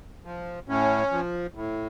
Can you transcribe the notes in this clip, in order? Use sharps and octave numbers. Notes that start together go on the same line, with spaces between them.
F3
A2 C#4
F3
A2